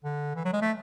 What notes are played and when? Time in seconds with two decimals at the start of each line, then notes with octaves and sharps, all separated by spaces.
0.04 D3
0.36 E3
0.45 F#3
0.53 G#3
0.61 A3